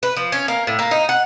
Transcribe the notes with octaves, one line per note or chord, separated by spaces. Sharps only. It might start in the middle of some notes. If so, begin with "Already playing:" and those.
B4
F3
C#4
A#3
A2
A#3
D#4
F#5